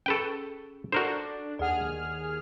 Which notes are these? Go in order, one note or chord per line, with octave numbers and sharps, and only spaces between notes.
C#4 G#4 A4 B4 G5 C#6
D4 F#4 A4 A#4 C5 D5
D#2 G#4 D5 F#5 F6